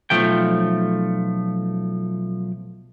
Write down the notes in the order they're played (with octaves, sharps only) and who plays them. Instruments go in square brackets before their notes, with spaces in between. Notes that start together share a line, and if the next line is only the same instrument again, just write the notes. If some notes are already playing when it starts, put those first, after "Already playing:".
[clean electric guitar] B1 F3 A3 G5